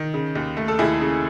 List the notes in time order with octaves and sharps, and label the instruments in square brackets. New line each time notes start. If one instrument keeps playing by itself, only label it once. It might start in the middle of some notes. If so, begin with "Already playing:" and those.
Already playing: [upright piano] D#3
C#3
D#2
A3
A4
D#2 E4 G#4
C#3